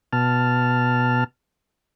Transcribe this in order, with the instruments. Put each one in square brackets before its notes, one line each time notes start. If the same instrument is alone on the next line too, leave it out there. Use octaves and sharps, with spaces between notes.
[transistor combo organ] B2 A5 F6